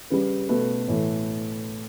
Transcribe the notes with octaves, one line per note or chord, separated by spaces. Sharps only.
C#3 G3 B4
B2 A3 B4
A2 E3 A3